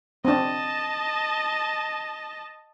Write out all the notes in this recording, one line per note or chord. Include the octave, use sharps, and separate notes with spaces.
C4 D4 D#5 A5